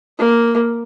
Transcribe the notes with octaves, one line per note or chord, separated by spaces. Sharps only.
A#3